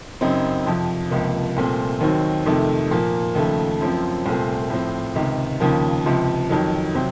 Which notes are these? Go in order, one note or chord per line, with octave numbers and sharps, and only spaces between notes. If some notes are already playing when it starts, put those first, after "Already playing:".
F#2 C#3 F#3 C4 D#4
F2 C3 F3
C#2 C3 F3 A#3
C2 A#2 A3 C4
D#2 D#3 F#3 C4
F2 C3 D#3 A3
A#2 F3 A#3
D#2 C#3 F3 A3
F#2 F3 C4
C2 A#2 A3 C4
A2 F3 C4
C#2 C3 D#3
D#2 C#3 F3 A#3
C#2 C3 F3
F2 D#3 F#3
C3 F#3 C4